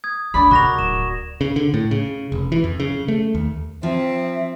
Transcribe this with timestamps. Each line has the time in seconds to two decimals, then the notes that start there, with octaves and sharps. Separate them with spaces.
0.04 D#6 G#6
0.34 D2 D4 D5 B5
0.51 C#3 F#4 A#4 C#6 A#6 F7
0.79 D1 E7
1.41 C#3
1.56 D3
1.74 A2
1.91 C#3
2.32 F1
2.52 E3
2.64 F2
2.80 C#3
3.08 A3
3.35 D#2
3.83 F3 C4 E5